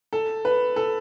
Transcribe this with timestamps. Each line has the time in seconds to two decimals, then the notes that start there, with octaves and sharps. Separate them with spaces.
0.13 A4
0.45 B4
0.76 A4